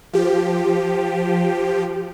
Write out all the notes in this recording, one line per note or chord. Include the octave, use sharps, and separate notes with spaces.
F3 G4